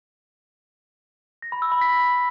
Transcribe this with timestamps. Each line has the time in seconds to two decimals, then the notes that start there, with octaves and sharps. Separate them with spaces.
1.42 A#6
1.52 B5
1.62 E6
1.72 B5
1.81 B6